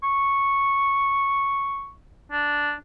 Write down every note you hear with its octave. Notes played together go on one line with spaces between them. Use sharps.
C#6
D4